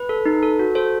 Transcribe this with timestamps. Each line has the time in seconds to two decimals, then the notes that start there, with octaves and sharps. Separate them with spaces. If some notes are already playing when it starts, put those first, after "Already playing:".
Already playing: B4
0.09 A4
0.26 D#4
0.43 A4
0.59 F#4
0.75 A4 C5